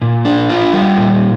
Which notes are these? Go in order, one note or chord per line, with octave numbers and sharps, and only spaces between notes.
A#2
D4
F4
G3
A#2